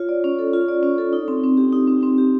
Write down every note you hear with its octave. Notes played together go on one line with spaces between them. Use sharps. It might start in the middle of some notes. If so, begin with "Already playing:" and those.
Already playing: F4 C#5
D5
C#4
A4
F4
D5
C#4
A4
D#4
C4
C4
G4
D#4
C4
C4
G4